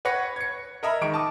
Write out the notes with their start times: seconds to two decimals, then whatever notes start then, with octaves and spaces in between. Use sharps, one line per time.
0.05 B4 C#5 F#5 C#6 A#6 C#7
0.36 G#6 C#7
0.83 A#4 D#5 E5 A#5 B5
1.01 D#3 G#3 C#6 D7
1.14 A5 D6 D#6